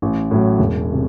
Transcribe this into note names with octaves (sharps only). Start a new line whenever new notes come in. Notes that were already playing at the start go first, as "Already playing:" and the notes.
A1
A2 F#3
E1
C3